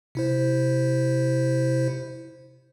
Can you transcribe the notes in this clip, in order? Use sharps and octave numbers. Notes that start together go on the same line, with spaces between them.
C3 E4 C5